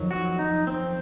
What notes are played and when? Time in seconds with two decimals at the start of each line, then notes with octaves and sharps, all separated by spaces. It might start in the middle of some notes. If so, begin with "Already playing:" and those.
Already playing: F2 D#3 F#3
0.11 F#4
0.39 D#4
0.67 C4